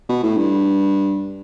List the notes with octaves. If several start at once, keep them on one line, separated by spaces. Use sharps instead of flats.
B2
A2
G2